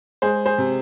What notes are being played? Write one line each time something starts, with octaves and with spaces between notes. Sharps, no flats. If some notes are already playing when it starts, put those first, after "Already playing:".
G#3 G#4 C5
G#4 C5
C3